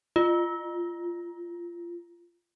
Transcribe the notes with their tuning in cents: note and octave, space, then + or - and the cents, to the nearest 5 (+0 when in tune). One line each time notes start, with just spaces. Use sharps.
F4 -15